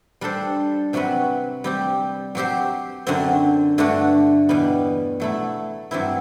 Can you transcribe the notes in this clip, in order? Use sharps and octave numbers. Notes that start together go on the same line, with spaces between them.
G3 D4 A4 C5
C3 F#3 C4 F#4 B4
G3 C4 G4
F#3 C4 G4 C5
F#2 D3 F#3 C4
G2 D3 A3 D4 F#4
E2 B2 G3 B3
F#3 A3 E4
G2 F#3 C4 E4